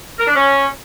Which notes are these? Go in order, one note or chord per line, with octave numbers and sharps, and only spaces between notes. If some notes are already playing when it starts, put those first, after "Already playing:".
A#4
D4
C#4